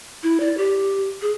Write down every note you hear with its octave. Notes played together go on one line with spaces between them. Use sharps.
E4
D5
G4
G#4